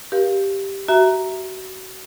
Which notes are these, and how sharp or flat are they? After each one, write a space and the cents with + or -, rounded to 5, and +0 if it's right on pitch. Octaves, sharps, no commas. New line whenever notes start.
G4 +0 A#4 +35 F5 +0
F#4 +30 E5 -5 A#5 +0